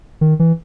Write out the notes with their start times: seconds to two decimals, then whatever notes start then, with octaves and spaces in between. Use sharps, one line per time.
0.21 D#3
0.39 E3